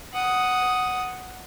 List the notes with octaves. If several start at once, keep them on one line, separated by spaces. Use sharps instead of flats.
F#5 D#6